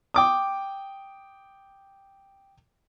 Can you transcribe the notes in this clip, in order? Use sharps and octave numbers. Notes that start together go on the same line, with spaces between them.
G5 D6 D#6